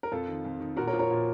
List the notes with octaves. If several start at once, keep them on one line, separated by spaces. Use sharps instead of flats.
A#4
F2 F4 A4
D#3
F2
D#3
A#2 F#4 A#4
A#4 C#5
F3
A#4 C#5
A#2